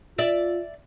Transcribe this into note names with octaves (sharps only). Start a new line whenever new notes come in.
F4 D5 E5